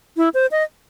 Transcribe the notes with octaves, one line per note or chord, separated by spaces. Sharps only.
E4
C5
D#5